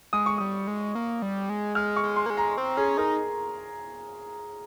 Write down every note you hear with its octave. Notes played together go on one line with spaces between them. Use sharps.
G#3 D#6
C#6
G3 D#6
G#3
A#3
G3
G#3
G#3 F6
C#6
G#3
C6
A#3
G#3
A#5
C4
C#4 G#4
D#4 A#4